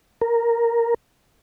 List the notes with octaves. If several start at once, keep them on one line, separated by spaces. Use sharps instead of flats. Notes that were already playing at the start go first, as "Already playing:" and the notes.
A#4